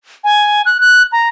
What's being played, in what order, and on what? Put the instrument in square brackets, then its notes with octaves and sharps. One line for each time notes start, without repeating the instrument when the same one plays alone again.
[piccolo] G#5
F#6
F#6
A#5